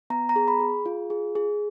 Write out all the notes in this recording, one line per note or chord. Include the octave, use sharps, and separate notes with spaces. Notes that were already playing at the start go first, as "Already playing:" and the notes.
B3 A#5
A#5
G#4
B5
G#4
F4
G#4
G#4